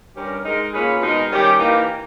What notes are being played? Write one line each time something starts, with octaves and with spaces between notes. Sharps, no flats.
G2 G3 C#4 G4 A#4
G#3 D#4 A#4
A#2 A#3 C#4 G#4 B4
B2 G#3 D#4 A#4
D#3 G3 C#4 G4
E3 A#3 D#4 G4 A#4